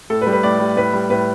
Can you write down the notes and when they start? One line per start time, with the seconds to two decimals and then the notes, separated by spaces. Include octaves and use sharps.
0.10 A2 A4
0.21 B4
0.27 G3
0.33 B4
0.43 A2 D5
0.60 G3
0.77 A2 B4
0.94 G3
1.10 A2 B4